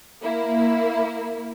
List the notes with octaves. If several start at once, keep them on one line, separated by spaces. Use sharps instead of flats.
A#3 E4